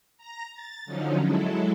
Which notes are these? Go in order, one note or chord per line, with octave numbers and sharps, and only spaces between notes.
A#5 A#6
A6
D3 F3 F#3 C#4 D#4
F#3 G#3 E4 A4